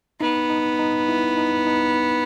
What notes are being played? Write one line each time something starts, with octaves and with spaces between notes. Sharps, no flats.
B3 D#4
D#4
D#4
E4
D#4
D#4